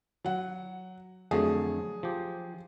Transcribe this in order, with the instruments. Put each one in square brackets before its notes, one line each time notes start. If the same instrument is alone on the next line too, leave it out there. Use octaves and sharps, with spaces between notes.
[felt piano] F#3 F#5
[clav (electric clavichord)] F2 D3 A3 [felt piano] F#3 G#4
[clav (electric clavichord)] F3 G4